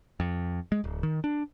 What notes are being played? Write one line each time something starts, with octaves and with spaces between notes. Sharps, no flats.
F2
G#3
D1
D#3
D4